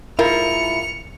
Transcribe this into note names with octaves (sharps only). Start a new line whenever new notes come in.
G#2 E4 F4 A#4 C#7 F7